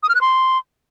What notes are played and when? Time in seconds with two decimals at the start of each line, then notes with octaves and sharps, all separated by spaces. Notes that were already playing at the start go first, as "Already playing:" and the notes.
0.03 D#6
0.09 F6
0.15 F#6
0.21 C6